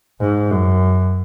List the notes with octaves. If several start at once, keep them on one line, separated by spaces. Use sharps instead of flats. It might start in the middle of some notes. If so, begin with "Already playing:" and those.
G#2
F#2